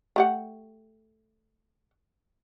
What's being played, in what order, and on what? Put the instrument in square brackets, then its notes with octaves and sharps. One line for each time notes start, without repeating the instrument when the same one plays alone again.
[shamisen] A3 G4 F#5